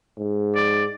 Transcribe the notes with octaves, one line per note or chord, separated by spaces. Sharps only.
G#2
D5